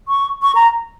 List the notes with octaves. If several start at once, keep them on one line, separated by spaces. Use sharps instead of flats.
C#6
C#6
A#5